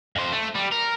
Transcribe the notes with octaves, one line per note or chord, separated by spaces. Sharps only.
F2 C5
A3
G3
A#4